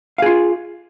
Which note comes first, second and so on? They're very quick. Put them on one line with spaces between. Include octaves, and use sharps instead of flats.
F5 G#4 F4